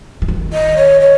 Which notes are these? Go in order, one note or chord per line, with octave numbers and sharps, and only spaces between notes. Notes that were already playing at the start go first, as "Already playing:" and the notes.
E3
D#3
D#5
C#5
C#5